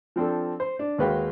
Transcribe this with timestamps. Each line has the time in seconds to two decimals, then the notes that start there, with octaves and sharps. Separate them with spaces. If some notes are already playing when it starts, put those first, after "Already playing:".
0.16 F3 C4 D4 A4
0.60 C5
0.79 D4
0.98 D#2 G#3 F#4 B4 F5 G5